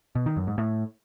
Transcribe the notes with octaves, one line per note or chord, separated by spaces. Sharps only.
B2
D#3
F#2
G#2
A2